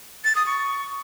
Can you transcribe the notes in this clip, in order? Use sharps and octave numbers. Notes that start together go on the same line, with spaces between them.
A6
D#6
C#6